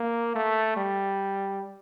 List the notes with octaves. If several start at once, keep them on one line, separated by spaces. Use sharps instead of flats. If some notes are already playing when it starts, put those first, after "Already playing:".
Already playing: A#3
A3
G3